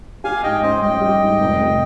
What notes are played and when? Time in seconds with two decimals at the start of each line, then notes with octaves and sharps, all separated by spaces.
0.24 G4 F5 G#5
0.43 G#2 D#5 G5
0.63 C#4 C5 D#5
0.82 G3 D#5 G5
1.01 G4
1.22 G#2
1.41 F1
1.60 F1